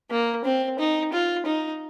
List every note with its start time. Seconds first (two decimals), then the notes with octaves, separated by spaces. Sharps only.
0.10 A#3
0.45 C4
0.79 D#4
1.13 F4
1.46 D#4